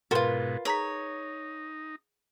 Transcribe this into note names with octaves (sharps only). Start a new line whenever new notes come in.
G#2 B2 F4 F#4 A#4 B4 C6 A6
D#4 G#4 C#5 A#5 B6